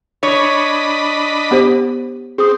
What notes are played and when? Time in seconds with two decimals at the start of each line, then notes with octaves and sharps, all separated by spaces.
0.23 D4 C#5 D#5 B5
1.51 B3 G4 C5
2.38 C4 G#4 D#6